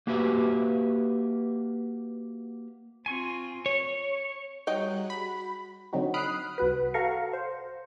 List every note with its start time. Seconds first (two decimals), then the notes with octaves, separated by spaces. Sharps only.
0.07 A#3 F#4 G4 B4 E5
3.06 C4 F4 G#5 C#6
3.66 C#5
4.67 F#3 G3 D#4 G#4 D#5 G5 F#6
5.10 F#4 B5
5.93 D3 F#3 C4 D#4 F#4
6.14 B5 D#6 F6 F#6 C7 D7
6.58 C2 F#4 B4
6.94 F#4 A4 F5 A#5 C#6
7.33 C5